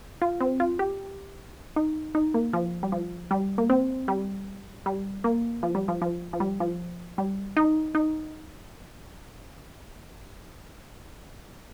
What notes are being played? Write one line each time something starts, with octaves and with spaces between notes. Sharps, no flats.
F4
C4
F4
G4
D#4
D#4
A#3
F3
G3
F3
G3
A#3
C4
G3
G3
A#3
F3
G3
F3
F3
F3
G3
F3
G3
D#4
D#4